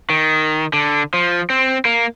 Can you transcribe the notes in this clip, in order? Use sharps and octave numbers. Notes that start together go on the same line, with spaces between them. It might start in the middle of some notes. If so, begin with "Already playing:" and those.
D#3
D3
F3
C4
A#3